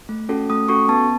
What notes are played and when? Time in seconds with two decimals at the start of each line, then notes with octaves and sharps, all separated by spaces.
0.09 A3
0.29 C#4 F#4 A4
0.50 A3 D#6
0.68 C#4 F#4 A4 C#6
0.89 B3 A5